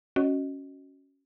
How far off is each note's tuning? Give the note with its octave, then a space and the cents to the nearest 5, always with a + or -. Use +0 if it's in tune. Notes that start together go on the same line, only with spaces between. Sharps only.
C#4 +0 F#4 +5 D#5 +0